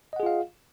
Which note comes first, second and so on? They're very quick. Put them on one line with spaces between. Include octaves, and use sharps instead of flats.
D#5 F#5 G#4 F4 F5